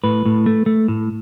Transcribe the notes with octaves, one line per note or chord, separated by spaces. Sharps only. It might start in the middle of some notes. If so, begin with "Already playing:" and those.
A2 B4
A2
A3
A3
A2